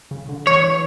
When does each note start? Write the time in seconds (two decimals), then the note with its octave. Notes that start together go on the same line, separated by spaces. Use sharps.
0.11 C#3
0.29 D3
0.47 E3 C#5